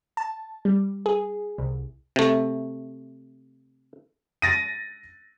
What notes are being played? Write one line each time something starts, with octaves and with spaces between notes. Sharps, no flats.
A5
G3
G#4
C2
C3 A3
A6 A#6 D#7